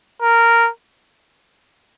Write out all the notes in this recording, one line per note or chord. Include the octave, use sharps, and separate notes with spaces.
A#4